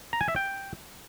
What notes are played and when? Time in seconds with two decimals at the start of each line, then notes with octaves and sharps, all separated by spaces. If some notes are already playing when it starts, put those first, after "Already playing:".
0.13 A#5
0.21 G#5
0.28 E5
0.36 G5